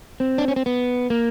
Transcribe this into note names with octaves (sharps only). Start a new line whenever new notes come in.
C4
D4
C#4
C4
B3
A#3